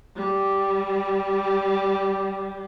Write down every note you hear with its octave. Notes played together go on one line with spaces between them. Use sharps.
G3